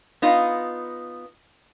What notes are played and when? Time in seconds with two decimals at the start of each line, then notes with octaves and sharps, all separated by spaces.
0.22 B3 D#4 F4